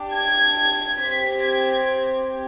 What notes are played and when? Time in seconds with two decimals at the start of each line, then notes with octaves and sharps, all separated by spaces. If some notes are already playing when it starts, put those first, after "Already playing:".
Already playing: D4 G4
0.14 G#6
1.00 C4 G4 B6
1.44 G#6